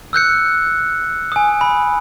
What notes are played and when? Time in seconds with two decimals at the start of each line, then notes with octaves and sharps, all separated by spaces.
0.13 E6 F#6 G6 C#7
1.32 G#5 D#6
1.61 B5